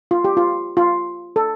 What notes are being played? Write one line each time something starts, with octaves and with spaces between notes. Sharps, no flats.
F4
G4
F4
F4
A4